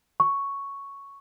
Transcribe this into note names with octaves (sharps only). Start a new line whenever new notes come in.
C#6